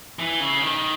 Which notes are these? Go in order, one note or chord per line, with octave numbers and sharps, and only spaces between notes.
E3
C#3
D#3